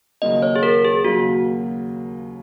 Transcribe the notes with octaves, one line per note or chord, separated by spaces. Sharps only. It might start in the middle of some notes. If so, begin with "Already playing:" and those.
D#2 C#3 F#3 A#3 D#5
C#5
G#4
A#4
G#4
D#2 C#3 F#3 A#3 F#4